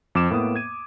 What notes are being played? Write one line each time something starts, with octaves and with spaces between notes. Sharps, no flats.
F2 D6 E7
A2 A#3 B3 D#6
G#6 D#7